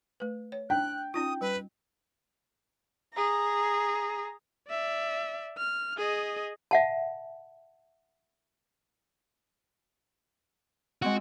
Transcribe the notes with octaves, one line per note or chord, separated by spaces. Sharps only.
A3 B4
C#5
D4 G5 F#6
C#4 D#4 F4 D#6
G3 B4
G#4 A#5
D5 E5
F6
G#4 D#5
E5 F#5 A5
G#3 C4 F#4 E6